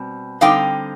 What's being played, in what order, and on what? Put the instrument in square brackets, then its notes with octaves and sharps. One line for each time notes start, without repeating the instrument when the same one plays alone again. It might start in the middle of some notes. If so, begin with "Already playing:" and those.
Already playing: [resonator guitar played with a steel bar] B2 G3 C4
D3 G3 C4 D#4 F5 G5